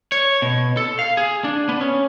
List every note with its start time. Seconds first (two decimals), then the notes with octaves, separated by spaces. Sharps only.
0.12 C#5
0.42 B2
0.77 A4
0.99 F5
1.17 G#4
1.44 D4
1.69 B3
1.81 C#4